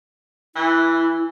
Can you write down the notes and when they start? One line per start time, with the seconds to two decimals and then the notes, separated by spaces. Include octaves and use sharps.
0.55 E3 E4